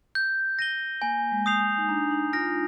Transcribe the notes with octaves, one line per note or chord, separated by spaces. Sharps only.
G6
A#6 D#7 G7
A#3 G#5
G#3
D#6 G6 C7 F7
G#3
D#4
D4 A#5
D#4
F4 F6 A#6 D7